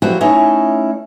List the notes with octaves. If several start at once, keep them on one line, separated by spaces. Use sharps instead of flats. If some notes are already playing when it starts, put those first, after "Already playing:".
F3 F#3 E4 F#4 G4
A3 C#4 D#4 E4 C#5